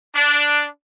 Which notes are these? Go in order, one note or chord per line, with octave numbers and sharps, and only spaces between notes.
D4